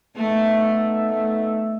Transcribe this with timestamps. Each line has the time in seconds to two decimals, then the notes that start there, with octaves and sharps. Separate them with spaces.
0.15 A3 B3 D#4 A4 E5
1.10 A3